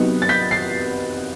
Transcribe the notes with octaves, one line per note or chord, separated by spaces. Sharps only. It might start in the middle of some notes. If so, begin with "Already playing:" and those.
Already playing: C3 F#3 B3 D#4
A6
G6 B6
A6 C7